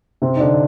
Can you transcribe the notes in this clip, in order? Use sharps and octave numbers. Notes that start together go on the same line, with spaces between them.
C3 C4
D#4
D3 D4